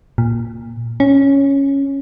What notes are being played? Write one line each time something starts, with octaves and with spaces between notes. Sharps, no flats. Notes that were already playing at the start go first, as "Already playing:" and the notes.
A#2
C#4